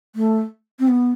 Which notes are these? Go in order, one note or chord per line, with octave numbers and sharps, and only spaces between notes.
A3
C4
B3